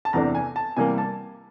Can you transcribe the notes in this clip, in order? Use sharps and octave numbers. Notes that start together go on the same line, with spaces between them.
A5
E2 C3 E3 A3 D4 A#5
G#5
A5
C3 E3 G3 A#3 G#5
A5